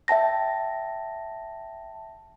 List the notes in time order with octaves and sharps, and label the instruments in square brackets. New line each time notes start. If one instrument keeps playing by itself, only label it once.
[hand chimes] E5 G5 A5 A#6